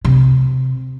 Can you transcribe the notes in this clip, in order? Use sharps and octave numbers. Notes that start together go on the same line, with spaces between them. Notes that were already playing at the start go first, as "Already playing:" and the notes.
C3